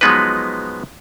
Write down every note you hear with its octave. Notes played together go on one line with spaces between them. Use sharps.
F3 F#3 G#3 B3 D#4 B4